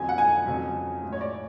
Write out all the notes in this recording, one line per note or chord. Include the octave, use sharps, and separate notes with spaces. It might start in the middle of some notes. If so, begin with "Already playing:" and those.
Already playing: F2 D3 F#3 G#5
F#5
G#5
F2 C#3 F#3
A2 G#3
C#5
D5